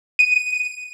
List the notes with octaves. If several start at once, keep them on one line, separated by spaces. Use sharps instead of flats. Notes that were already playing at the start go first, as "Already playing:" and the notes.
D#7